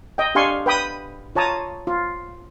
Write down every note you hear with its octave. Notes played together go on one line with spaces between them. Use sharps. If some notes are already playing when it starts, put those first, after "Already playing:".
D#5 G5
D4 G4 F5 G#5 C6 C#6
B4 G5 B5 D#6
F4 C#5 A5 A#5 D#6
F4